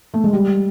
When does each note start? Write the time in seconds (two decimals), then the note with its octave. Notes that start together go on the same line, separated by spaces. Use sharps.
0.14 A3
0.24 G#3
0.33 G3